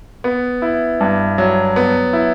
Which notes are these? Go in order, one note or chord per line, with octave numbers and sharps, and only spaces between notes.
B3
E4
G2
F#3
B3
E4